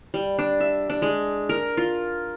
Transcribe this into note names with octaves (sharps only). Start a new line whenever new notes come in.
G3
D4
E5
D4
G#3
A#4
F4